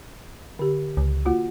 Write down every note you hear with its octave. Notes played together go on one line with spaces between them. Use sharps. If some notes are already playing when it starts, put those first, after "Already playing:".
D3 G4
C#2
A#3 F4 F#4